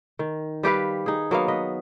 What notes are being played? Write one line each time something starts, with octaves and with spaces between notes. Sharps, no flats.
D#3
G3 G4 B4 F5
D#4 G#4
F#3 A#3 B3 F5
B4 D#5